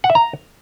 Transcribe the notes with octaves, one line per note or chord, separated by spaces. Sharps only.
F#5
E5
A#5